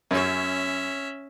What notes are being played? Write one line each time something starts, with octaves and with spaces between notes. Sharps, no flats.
F#2 C#4 C#5 E5